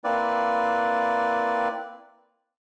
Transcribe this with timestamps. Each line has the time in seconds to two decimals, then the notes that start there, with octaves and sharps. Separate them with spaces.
0.04 A#3 C4 E4 B4 D5